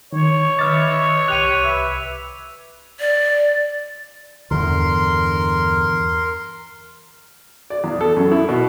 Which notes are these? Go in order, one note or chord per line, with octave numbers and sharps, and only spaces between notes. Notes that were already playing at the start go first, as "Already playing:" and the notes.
D#3 C#5
D#3 B4 D#5 E5 D6 F6 A6
C2 G4 F#6 D#7 F7
B4 E5
D5
E2 G2 D3 A#4 C6
D5
E2
A4
F#2
E4
B2